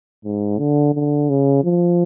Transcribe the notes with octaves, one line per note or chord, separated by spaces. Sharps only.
G#2
D3
D3
C#3
F3